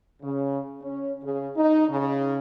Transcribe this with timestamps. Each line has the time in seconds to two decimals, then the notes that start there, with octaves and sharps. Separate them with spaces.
0.22 C#3
0.82 C#4
1.22 C#3
1.56 D#4
1.88 C#3